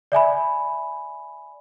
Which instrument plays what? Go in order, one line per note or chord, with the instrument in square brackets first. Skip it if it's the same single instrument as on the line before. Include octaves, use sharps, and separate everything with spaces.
[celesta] D5 E5 G#5 B5